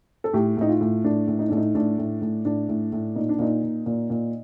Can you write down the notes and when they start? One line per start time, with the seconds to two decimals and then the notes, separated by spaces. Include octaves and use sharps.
0.24 A4
0.34 A2 G4
0.57 A2 D#4
0.69 F4
0.81 A2
1.04 A2 D4
1.28 A2
1.39 D#4
1.48 A2 D4
1.57 D#4
1.75 A2 D4
1.98 A2
2.22 A2
2.45 A2 D4
2.69 A2
2.92 A2
3.16 A#2 D#4
3.29 D4
3.39 A#2 D#4
3.63 A#2
3.86 A#2
4.10 A#2